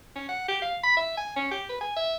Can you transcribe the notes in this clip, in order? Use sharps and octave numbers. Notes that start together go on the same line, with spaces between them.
C#4
F#5
G4
F5
B5
E5
G#5
C#4
G4
B4
G#5
E5